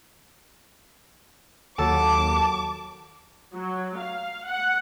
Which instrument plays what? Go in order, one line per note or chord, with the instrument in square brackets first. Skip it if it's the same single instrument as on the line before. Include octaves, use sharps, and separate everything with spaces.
[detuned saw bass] D#2 [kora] F#3 A4 [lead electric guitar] A5 [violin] D6
[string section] F#3
F5
F#5